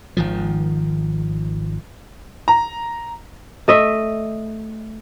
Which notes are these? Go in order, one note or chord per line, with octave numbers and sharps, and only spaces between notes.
G#1 D#3 F3
A#5
A3 D#5 E5